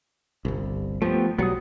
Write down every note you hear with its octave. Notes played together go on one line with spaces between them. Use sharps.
G1 C2
F3 A3 B3 G4
B1 F#3 G3 B3 F#5 D#6